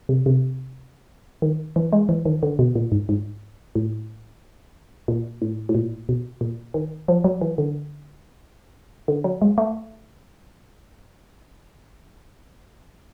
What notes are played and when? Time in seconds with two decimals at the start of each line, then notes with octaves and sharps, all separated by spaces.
0.09 C3
0.26 C3
1.42 D#3
1.76 E3
1.92 G#3
2.09 E3
2.26 D#3
2.43 D3
2.59 B2
2.76 A#2
2.92 G#2
3.09 G#2
3.75 A2
5.08 A#2
5.42 A2
5.69 A2
5.75 A#2
6.09 B2
6.41 A#2
6.74 D#3
7.08 F3
7.24 F#3
7.41 E3
7.58 D3
9.08 D3
9.24 F#3
9.42 G#3
9.58 A3